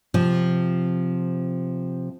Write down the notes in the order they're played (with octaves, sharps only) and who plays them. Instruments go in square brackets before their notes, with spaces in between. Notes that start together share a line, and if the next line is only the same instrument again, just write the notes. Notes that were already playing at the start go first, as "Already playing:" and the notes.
[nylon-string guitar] C3 F3